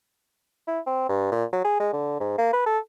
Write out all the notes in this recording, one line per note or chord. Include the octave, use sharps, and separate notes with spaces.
E4
C4
G2
A#2
F#3
G#4
G#3
D3
G#2
A#3
B4
A4